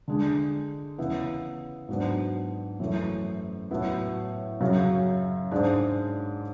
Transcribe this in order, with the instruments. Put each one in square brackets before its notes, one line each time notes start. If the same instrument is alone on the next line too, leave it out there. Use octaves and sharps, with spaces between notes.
[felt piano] D3 G#3 D4
C#3 E3 B3 E4
G#2 F#3 B3 D4
F#2 E3 A3
A2 F#3 B3 E4
F#2 C#3 F#3
G#2 G#3 D4